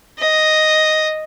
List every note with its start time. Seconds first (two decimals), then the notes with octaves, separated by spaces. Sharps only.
0.19 D#5